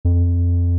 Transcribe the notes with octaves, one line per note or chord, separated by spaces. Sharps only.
F2